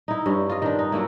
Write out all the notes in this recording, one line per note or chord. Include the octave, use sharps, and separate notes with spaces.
D#4 E4
G2 C#4
F4 D#5
D#3 D4
D#4
F#3 A3 A#3 E4